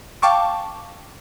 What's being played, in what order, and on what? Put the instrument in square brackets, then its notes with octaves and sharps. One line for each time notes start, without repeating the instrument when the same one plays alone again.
[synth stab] F5 G5 A5 C#6 D6